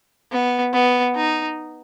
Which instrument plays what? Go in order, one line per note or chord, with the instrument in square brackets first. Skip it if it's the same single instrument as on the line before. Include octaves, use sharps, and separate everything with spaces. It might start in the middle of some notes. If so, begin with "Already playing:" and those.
[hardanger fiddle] B3
B3
D#4